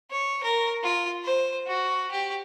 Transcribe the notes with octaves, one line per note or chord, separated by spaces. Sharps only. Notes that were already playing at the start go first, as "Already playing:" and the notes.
C#5
A#4
F4
C5
F#4
G4